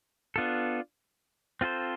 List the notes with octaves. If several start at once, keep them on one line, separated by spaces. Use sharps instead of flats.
B3 D4 F4 A4
C4 F4 A4 C5